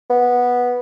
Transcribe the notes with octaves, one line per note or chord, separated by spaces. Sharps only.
B3